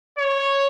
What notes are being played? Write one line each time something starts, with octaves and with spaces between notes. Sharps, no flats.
C#5